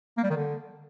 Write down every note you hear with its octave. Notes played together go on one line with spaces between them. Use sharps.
A#3
G3
D#3
D3